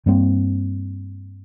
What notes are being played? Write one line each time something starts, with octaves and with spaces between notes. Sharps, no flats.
G2 G3 A#3 C4